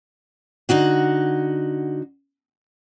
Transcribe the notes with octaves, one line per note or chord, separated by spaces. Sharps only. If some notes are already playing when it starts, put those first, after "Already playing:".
D3 D#4 F#4 F#5